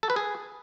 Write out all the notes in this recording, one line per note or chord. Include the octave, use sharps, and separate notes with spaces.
A4
B4
G#4